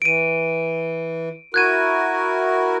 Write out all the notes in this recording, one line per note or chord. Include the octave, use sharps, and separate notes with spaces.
E3 D7 D#7
E4 F#4 A#4 F#6 G#6 D#7